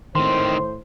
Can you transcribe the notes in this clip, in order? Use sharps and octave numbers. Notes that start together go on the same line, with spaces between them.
A2 D#3 C4 C5 C6